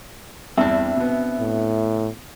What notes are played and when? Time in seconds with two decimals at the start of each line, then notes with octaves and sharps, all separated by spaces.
0.58 E2 G2 C4 D4 E5
0.96 B2 B3
1.40 A2